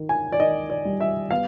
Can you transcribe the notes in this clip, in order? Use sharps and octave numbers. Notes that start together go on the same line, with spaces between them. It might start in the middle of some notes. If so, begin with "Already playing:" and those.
Already playing: D#3
G#5
D5
D#3 D#5
D5
G3
E5
B3 F5